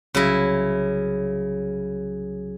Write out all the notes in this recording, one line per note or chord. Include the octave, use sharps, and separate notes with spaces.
C2 C#3 F#3 E4 A#6